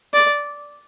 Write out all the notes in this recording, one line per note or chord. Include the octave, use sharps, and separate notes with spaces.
D5